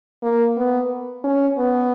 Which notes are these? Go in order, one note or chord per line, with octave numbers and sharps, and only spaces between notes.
A#3
B3
C#4
B3